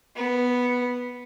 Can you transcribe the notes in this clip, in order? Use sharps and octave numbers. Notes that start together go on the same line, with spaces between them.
B3